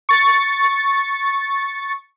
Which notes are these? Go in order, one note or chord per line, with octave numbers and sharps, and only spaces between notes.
C#6 A6